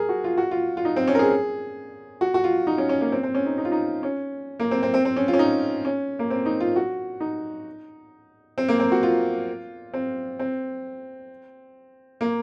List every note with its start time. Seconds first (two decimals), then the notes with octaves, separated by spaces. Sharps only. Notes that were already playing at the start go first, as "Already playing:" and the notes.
Already playing: G#4 A#4
0.09 F#4
0.24 F4
0.37 F#4
0.51 F4
0.77 F4
0.85 D#4
0.96 C4
1.08 C#4
1.15 A#4
1.19 G#4
2.21 F#4
2.34 F#4
2.44 F4
2.67 D#4
2.78 C#4
2.89 C#4
3.01 A#3
3.12 C4
3.23 C4
3.34 C#4
3.46 D#4
3.58 D#4
3.65 F4
3.72 D#4
4.03 C#4
4.60 A#3
4.71 C4
4.83 C4
4.94 C4
5.05 C4
5.16 C#4
5.28 F4
5.33 C#4
5.39 D#4
5.85 C#4
6.19 A#3
6.30 C4
6.46 D#4
6.60 F4
6.76 F#4
7.20 D#4
8.58 C4
8.68 A#3
8.80 C4
8.92 F#4
9.03 F4
9.94 C4
10.39 C4
12.21 A#3